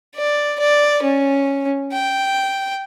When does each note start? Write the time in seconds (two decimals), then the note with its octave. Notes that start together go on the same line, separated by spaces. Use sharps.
0.15 D5
0.60 D5
1.03 C#4
1.92 G5